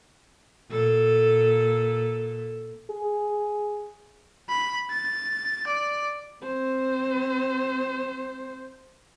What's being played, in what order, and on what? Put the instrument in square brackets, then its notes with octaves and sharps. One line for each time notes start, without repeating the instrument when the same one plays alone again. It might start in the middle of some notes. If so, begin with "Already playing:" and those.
[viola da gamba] A#2 A4
[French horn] G#4
[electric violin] B5
A6
D5
[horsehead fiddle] C4 C5